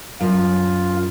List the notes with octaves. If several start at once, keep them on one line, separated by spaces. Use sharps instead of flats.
F#2 F4